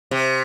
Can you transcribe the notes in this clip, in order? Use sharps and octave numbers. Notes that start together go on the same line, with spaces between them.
C3